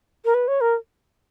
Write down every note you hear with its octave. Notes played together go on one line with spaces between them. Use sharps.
A#4
B4
C#5
A#4